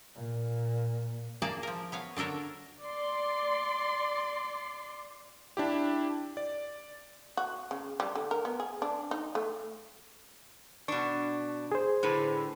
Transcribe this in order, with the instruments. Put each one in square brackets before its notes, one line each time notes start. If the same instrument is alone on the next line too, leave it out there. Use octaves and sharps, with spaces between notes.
[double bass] A#2
[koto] A#3 G#4 D5 A5 A#5
F3 A#4
B3 C#5 F5
D3 D4 A4 A#4 C#5
[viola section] D5 C6
[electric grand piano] D4 E4 G4
D5
[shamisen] F#4
C#3
G3
D3
A#4
B3
G#4
D4
D#4
A3
[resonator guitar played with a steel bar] B2 D4 [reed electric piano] C#6
[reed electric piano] G#4 C5
[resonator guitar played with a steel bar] A2 D3 B4